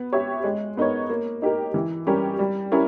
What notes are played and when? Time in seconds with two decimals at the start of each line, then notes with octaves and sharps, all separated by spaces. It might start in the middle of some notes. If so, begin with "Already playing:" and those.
Already playing: B3
0.12 G4 C#5 E5
0.44 G#3
0.77 B3 D#4 A#4 C#5
1.10 A#3
1.42 D#4 G4 A#4
1.74 E3
2.07 G3 C#4 G4 A#4
2.39 G3
2.72 C#4 E4 G4 A#4